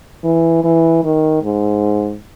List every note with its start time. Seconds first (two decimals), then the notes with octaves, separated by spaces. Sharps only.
0.24 E3
0.64 E3
1.04 D#3
1.43 G#2